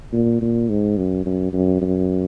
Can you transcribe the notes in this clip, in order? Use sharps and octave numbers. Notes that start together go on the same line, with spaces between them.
A#2
A#2
G#2
F#2
F#2
F#2
F#2